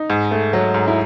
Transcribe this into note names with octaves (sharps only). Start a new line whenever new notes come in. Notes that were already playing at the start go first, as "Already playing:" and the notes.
Already playing: D#4
G#2
A3
F#3
G#2
E4